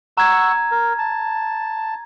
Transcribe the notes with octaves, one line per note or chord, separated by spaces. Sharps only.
F#5 A#5 C#6 E6 G#6
A#4
A5